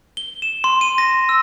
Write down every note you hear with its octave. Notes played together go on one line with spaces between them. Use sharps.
G7
E7
C6
D#7
A#6
E6